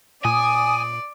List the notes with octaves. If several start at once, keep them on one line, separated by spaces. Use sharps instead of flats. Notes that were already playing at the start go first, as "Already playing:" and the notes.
A#2 D5 G#5 D#6